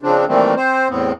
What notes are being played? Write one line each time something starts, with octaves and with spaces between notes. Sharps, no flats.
C#3 F3 C4 D4
A#2 D#3 E3 G3 A3 C4
C4 C5
E2 A2 B3 C4